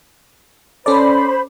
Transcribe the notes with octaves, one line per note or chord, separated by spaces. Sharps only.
C#4 A4 C5 D5 B5